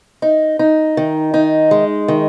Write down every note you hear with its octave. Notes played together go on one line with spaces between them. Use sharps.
D#4
D#4
D#3
D#4
G#3
D#3